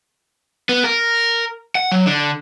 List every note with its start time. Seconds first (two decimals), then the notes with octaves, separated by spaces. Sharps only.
0.69 B3
0.84 A#4
1.75 F#5
1.92 F#3
2.06 D3